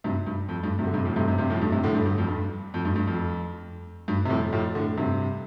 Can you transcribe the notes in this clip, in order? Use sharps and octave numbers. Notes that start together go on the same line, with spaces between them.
G2 C3
G2
F2
G2
G2 C3
D3
G2 C3
F2 A2
G2 C3
G2 C3
G2 C3
F2 A2
G2
G2 C3
A2 D3
G2
G2
F2
G2
F2
G2
G2
F2
G2
C3
F2 A2
F2 A2
A2 D3
G2 C3